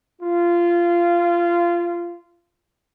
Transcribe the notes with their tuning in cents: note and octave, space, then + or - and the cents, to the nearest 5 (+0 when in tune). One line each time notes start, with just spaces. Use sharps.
F4 -20